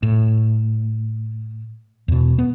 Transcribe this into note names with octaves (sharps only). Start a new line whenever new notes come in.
A2
E2 B2
B3